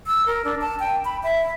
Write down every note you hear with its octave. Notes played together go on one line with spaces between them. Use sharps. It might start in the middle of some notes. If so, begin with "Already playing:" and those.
E6
A#4
D4
A5
G5
B5
E5